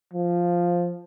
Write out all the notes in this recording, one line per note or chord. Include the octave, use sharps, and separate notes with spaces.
F3